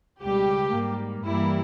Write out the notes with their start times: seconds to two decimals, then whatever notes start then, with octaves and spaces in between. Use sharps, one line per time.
0.22 C#2 B2 G3 G4
0.73 G#2 G3 A#3
1.25 G2 E3 G3 A#3 E4